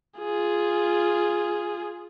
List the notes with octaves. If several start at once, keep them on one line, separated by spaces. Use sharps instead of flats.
F4 G#4